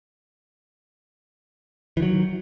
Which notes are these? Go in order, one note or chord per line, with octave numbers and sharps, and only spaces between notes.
D#3 E3 F#3